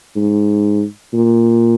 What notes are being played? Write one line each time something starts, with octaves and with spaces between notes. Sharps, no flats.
G#2
A#2